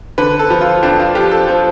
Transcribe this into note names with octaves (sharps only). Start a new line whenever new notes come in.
D3 B4
A4
F3
F4
F2 D4
F4
F3 G4
A4
F3